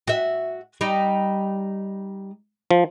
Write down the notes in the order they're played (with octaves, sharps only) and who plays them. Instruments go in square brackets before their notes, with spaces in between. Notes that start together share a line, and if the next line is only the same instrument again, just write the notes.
[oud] F#4 E5
G3 D#4
[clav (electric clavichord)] F3